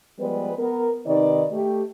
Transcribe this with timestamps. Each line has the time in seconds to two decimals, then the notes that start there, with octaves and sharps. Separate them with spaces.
0.20 F3 G3 G#3 B3 B4
0.59 B3 A#4
1.06 C3 D#3 D#4 B4 D5 D#5
1.52 A3 G4